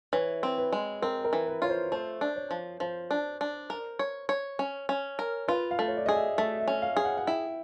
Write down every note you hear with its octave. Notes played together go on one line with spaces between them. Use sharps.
E3 C#5
C4
B4
G#3
C4 A#4
A#4
E3
B4
F4 C#5
C5
A3 C5
D4
C#5
F3
F3 C5
D4
D4
A#4
C#5
C#5
C#4
C#4
A#4
F4 B4
F5
A3
C#5
D5
G#4 D#5
E5
A3 E5
E5
C#4
F5
G#4
F#5
F#5
E4 G5